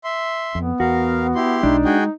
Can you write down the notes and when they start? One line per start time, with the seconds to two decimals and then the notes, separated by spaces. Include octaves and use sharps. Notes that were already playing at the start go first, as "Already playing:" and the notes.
0.04 E5 C6
0.55 F2 B3
0.80 E2 F#4 A#4 F5
1.35 E4 G4 C6
1.63 B1 G#3 D4 D#4
1.85 G#3 F#4 G#4 G5